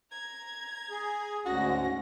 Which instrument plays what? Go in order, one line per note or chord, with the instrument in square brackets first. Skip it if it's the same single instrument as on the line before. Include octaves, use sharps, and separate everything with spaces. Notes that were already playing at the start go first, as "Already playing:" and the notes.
[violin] A#5 G#6
[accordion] G#4
[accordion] D2 G#2 [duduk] C#4 [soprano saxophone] F#4 [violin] A#6